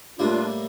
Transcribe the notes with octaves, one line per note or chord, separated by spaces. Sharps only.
A2 G3 A#3 D4 F4